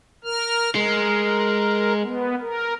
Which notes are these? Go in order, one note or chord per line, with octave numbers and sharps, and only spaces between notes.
A#4 F6
G#3 A#4
B3
A#4